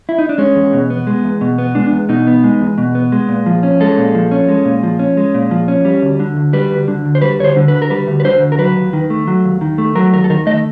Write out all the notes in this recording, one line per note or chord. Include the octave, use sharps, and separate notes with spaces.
E4
D#4
D4
G#3 C#4
E2
B2
B3
G#3
E2
B2
B3
G#3 D4
E2
B2 D#4
B3
G#3
E2
B2
B3
G#3
A#2
F3
C#4
G#3 A4
A#2
F3
C#4
G#3
A#2
F3
C#4
G#3
A#2
F3
C#4
G3
D2
D3
D2
G3 B4
D2
D3
D2
C5
G3 B4
D2 C#5
C5
D3
B4
D2
A#4
G3 B4
D2
B4
D3 C5
D2
A#4
F#3 B4
D#2
D#3
A3
F#3
D#2
D#3
A3
F#3 A#4
D#2 A#4
A4
D#3 A#4
A3 D#5